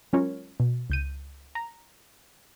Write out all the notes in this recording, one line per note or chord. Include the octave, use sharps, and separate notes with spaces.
F#3 G#3 C#4 F4 A#4 C#5
B2
C#2 G6 D#7
A#5